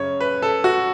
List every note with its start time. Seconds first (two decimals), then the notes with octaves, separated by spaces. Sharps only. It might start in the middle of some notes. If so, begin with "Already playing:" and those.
Already playing: F#2 C#3 C#5
0.21 B4
0.42 A4
0.64 F#4